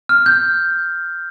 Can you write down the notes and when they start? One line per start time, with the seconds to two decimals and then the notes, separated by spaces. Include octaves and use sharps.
0.09 F6
0.26 G6